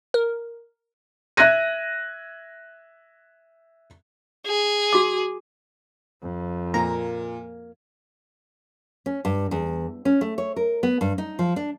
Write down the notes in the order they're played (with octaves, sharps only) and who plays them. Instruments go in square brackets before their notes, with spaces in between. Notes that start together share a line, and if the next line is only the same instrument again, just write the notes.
[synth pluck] A#4
[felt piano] E5 F#6 G#6 A#6 D#7
[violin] G#4
[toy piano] F#4 D6
[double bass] F2
[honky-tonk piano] A#2 [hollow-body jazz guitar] A#3 [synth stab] A#5
[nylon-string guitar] C#4
G2
E2
C#4
A3
C#5
A#4
B3
G2
D#4
F3
D4